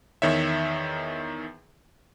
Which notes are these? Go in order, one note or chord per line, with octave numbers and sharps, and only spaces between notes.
E2 D#3 C#5 E5